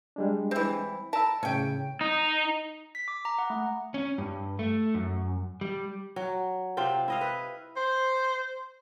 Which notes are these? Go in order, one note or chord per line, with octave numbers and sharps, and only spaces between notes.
G3 G#3 D4
E3 C4
A#4 A5 B5 E6
A2 C#3 C#4 G5
D#4
B6
D6
A#5
F#5
A3
C#4
G2
A3
F#2
G3
F#3
C3 C4 F4 G5
E4 D#5 F5
B4
C5